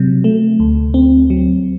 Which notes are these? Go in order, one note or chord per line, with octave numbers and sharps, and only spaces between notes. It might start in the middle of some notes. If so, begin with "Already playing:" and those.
Already playing: C3 F#3
A3
D2
C4
F#3